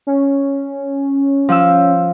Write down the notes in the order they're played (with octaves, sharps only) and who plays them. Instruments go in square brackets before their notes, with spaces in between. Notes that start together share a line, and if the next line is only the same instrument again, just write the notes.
[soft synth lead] C#4
[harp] F3 E6